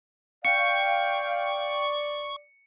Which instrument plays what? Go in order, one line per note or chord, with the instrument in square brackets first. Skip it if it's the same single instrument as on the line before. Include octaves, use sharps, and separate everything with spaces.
[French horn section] D5 [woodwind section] F5 G5 [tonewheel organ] C#6 [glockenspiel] C#7